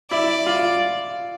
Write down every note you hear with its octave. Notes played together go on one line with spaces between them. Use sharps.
E4 D5
F4